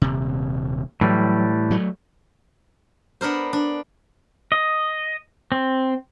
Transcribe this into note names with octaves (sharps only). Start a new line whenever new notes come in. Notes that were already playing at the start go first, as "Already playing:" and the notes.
D#1 C3
A2 E3 F#3 G3
F#3 A3
B3 D4 A#4 C5
D4
D#5
C4